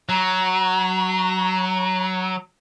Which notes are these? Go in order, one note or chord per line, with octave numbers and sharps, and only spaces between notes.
F#3 A#5